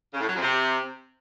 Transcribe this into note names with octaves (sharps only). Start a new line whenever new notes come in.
C#3
A2
F#3
F2
C3